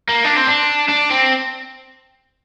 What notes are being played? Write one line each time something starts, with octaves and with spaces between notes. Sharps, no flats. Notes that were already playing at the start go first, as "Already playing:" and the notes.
A#3
D4
C4
D4
D4
C4